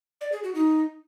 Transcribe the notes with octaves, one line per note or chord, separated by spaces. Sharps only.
D5
G#4
F#4
D#4